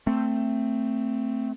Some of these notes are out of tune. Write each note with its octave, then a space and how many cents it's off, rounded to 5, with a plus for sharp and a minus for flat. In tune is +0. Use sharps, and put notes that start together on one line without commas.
A3 +20 C4 +0